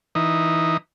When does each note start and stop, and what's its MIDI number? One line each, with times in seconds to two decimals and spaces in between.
0.15 0.77 52
0.15 0.77 63